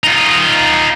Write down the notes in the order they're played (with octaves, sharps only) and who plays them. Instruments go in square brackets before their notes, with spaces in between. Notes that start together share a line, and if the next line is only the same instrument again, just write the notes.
[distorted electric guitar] D#4 F4